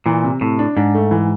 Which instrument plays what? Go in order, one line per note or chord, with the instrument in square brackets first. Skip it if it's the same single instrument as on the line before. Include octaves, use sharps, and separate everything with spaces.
[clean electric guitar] A#2 [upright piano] E3
[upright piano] C3
[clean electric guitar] A2 [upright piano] C3
[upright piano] D4
[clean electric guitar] G#2 [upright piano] D4
[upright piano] A3
E3